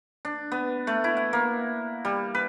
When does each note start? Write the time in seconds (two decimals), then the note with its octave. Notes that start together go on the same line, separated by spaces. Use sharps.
0.25 D4
0.52 B3
0.87 A3
1.04 E4
1.17 F#5
1.33 A#3
2.05 G3
2.35 B4